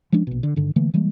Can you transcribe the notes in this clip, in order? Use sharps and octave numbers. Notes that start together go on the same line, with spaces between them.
F3 G#3 C#4 D4
A#1 B2
D3
G2 D3 D#3
D3 E3 A3 A#3
E3 G3 G#3 A#3